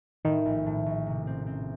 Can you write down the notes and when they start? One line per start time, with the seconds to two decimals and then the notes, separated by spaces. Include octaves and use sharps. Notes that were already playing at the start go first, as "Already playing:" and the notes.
0.25 A2 D#3
0.45 A#1
0.66 A2
0.86 A#1
1.06 C3
1.27 C4
1.47 C4